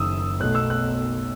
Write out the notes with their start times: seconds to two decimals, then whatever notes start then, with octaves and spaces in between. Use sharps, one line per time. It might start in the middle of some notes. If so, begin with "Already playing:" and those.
Already playing: F#1 F#2 D#3 D#6 E6
0.40 B1 B2 A3 F#6
0.55 E6
0.70 F#6